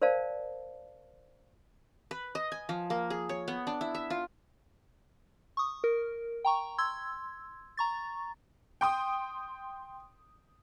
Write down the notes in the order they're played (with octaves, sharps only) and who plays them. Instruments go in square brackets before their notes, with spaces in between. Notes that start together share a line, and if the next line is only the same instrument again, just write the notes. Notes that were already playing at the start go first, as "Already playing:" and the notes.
[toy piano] A#4 C5 D5 F5 A5
[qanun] B4
D#5
G#5
F3
A#3
G#4
C#5
B3
D4
E4
E5
F4
[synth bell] C#6 D#6
A#4
G5 A#5 C#6
C6 E6 G#6
A#5 C#6 A6
[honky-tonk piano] G5 C6 D#6